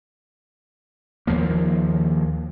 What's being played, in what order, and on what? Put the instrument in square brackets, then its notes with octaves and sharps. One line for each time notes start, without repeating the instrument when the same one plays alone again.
[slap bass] D#2 F3 A#3